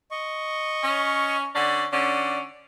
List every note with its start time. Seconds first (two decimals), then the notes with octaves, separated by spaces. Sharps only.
0.11 D#5 C#6
0.83 C#4
1.55 D3 C#4 D5
1.92 D3 C#4 D5